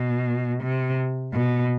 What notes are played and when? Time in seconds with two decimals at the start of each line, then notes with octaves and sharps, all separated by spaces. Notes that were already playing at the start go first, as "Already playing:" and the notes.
Already playing: B2
0.63 C3
1.33 B2